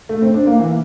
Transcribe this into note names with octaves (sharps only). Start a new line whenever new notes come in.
A3
C4
D4
A#3
E3